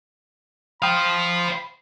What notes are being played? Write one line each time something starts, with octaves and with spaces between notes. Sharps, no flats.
C5 F5 G5 B5 C6 D#6 F6